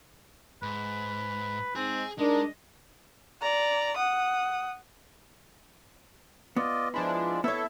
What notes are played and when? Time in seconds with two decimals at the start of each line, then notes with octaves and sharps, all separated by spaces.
0.63 G#2 B4
1.76 G#2 C4 D#4 G#4
2.19 G#3 D4 D#4 A#4 D#5
3.42 D5 A#5
3.97 F#5 D#6
6.56 B3 F4 D5 D#5
6.94 F3 G#3 D4 E4
7.44 B3 E4 A4 C#5 E5